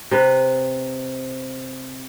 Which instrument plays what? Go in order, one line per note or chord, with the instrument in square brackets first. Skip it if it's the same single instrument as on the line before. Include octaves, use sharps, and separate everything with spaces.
[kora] C3 B4